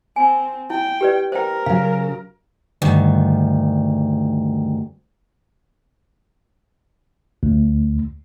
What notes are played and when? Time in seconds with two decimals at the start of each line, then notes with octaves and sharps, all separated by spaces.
0.16 C4 G#5
0.70 E4 G5
1.01 G4 B4 D5
1.32 A#4 C5 G5
1.66 C#3 F#3 F5
2.82 D2 G2 D#3
7.43 D2